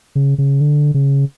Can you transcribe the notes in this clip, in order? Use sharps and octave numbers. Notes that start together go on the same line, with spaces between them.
C#3
C#3
D3
C#3